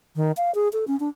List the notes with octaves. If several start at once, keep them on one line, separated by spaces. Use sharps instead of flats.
D#3
F5
G#4
A4
C#4
D4